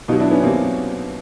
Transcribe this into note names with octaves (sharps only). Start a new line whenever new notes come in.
B2 F#3 D#4 F4
D4 E4
B3 C#4
B2 F#3 A#3 C4